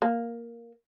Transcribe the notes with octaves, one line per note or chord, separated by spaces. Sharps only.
A#3